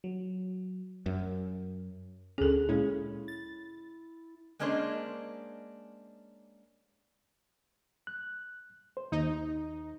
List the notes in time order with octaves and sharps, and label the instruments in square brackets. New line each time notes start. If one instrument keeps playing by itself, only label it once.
[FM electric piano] F#3
[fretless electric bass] F#2
[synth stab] D2 D3 [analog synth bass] C#4 [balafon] G#4 A4
[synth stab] A#2 G#3 C#4 [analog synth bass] E4
[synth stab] A6
[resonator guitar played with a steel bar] G#3 A#3 C#4 D4 C5 D#5
[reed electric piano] F#6
C5
[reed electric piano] D#2 [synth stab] D#4